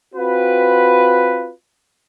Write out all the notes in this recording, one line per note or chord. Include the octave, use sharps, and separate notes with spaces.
C4 F4 F#4 B4